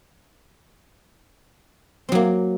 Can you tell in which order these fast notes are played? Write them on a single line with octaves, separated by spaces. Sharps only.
C4 F#3 A#3